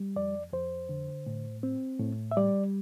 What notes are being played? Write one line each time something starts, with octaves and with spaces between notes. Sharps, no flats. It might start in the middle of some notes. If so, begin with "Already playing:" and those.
Already playing: G3
F2 D5
F2 C5
D3
A2
C4
A2
E5
G3 D5